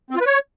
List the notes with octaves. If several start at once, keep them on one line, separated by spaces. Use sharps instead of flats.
C4
F4
B4
C#5